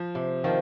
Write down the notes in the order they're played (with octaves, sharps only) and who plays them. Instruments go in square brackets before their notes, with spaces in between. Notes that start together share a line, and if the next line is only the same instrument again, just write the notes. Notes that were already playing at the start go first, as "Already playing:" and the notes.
Already playing: [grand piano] F3
[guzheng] C3
[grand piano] D#3 [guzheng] F3